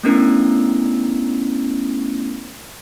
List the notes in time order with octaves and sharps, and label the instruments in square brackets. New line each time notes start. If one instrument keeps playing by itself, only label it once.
[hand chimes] A3 B3 C#4 D4 E4 A#4